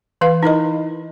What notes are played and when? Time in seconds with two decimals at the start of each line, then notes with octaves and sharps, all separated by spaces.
0.21 E3 B4 F5
0.43 D#4 E4 A#4 D#5